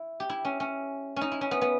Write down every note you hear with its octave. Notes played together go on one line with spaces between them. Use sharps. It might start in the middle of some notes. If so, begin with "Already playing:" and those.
Already playing: E4
G4
E4
C#4
C#4
C#4 D#4
E4
C#4
B3
B3